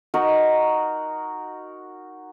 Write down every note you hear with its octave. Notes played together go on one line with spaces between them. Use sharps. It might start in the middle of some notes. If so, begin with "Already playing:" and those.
D#4 F#4 A#4 F#5